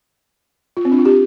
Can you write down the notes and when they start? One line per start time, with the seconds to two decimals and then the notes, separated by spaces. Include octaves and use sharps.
0.77 F4
0.85 C4
0.91 D4
0.98 F4
1.05 G4